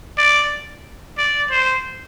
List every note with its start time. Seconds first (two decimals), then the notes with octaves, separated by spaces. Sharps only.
0.18 D5
1.18 D5
1.51 C5